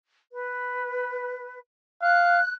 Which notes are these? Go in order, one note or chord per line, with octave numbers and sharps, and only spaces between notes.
B4
F5 F#6